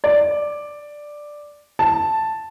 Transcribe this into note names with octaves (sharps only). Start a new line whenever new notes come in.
D5
A5